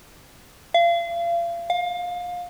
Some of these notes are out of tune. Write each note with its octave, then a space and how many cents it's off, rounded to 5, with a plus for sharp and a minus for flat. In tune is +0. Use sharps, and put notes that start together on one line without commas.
F5 -35
F5 +25